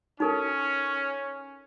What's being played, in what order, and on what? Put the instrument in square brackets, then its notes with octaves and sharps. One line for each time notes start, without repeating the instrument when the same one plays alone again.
[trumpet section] C#4 [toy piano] D#4 A4 A#4